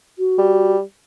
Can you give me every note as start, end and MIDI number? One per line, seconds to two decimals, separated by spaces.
0.18 0.74 66
0.38 0.81 55